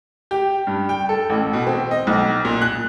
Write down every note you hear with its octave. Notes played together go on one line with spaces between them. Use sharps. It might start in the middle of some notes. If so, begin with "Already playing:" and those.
G4
G2
G5
A4
A1
B2
C4
D#5
B1
A#2
F#6